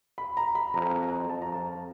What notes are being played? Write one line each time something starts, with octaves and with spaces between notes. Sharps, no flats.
B5
A#5
B5
F2 A#5
A#5
F2 A5
A#5
A5